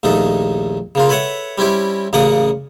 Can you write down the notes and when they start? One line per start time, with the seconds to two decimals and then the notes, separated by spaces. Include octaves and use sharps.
0.03 A#1 D#2 A3 D#4 A4
0.95 C#3 A#3 F4
1.09 A4 B4 C#5 E5 F#5
1.58 G3 C4 C#4 E4 G4
2.13 A1 C#3 A#3 D5 F#5 D#6